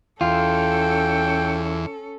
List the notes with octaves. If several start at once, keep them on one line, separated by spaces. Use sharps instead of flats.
E2 C#4 F4 A4 G5